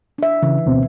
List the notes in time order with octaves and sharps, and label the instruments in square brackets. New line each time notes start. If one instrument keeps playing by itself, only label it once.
[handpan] D4 E5
[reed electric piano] C#3 [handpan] E3
[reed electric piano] D2 B2 C4